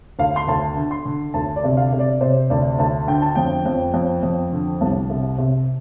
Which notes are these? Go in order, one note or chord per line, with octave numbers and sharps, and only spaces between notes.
D2 F5
C6
D2 A5
D3
C6
D3
D2 A5
D5
C3
F5
C3
D5
C3 C5
D2 D5
D2 A5
D3 G5
A5
F2 G5
F2
F2
F2
D3
C2 A5
C3
C3